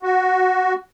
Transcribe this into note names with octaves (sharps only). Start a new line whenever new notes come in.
F#4